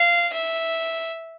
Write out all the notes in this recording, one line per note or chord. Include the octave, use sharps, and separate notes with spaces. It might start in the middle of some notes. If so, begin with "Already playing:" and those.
Already playing: F5
E5